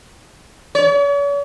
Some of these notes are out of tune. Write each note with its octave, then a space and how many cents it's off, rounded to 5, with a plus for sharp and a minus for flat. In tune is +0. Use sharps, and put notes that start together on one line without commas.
C#5 +45